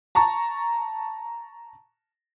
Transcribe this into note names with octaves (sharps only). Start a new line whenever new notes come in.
A5 A#5 C#6